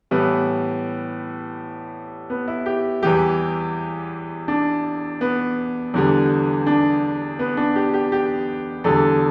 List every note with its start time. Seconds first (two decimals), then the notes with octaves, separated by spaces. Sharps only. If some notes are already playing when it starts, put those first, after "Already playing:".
0.11 A2 E3 G3 B3
2.30 B3
2.48 E4
2.66 G4
3.02 E2 E3 G3 G4
4.48 D4
5.21 B3
5.94 E2 D3 G3
6.67 D4
7.39 B3
7.57 D4
7.76 G4
7.94 G4
8.12 G4
8.84 E2 D3 G3 A4